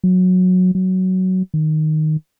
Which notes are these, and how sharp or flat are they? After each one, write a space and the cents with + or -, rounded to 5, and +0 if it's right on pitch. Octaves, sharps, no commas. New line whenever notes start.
F#3 -15
F#3 +10
D#3 -5